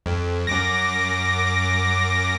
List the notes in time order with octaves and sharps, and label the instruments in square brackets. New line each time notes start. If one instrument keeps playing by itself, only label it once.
[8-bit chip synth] F2
F#2 D6 A#6